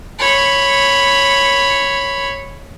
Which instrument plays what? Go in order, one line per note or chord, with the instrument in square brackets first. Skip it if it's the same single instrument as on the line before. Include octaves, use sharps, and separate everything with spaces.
[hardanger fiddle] C#5 B5